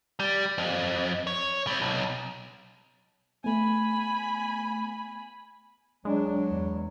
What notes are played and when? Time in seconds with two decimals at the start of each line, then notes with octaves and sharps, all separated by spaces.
0.19 G3
0.58 F2
1.27 C#5
1.67 G3 C4
1.82 B1
3.44 A3 B3 G#5 B5
6.05 F#3 G#3 D4
6.49 E2